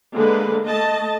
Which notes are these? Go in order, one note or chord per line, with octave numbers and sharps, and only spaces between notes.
D3 G#3 A#3 B4
A3 D#5 A5